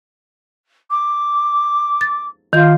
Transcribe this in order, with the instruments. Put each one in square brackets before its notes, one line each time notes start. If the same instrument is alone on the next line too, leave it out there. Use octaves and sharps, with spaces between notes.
[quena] D6
[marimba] A6
[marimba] D#3 G6 [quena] F4